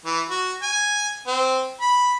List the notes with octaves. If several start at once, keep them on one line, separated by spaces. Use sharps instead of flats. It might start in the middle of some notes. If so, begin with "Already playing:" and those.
E3
F#4
G#5
C4
B5